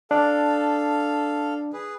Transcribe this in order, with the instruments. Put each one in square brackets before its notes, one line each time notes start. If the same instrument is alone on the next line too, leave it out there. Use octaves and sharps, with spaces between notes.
[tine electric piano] D4 [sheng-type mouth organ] A4 F5
[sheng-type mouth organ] G#4 B4